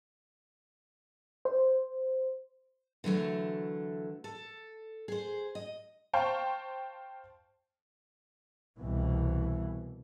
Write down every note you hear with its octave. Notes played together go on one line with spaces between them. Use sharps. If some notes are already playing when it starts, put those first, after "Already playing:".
C5
D3 E3 F#3 A3
A4
G#4 C5
D#5
C5 F5 G5 A5 C#6
C2 B2 E3